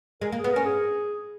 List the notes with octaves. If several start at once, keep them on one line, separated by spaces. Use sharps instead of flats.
G#3 A#4
A#3
G#4
B3
C#4 A#4
G#4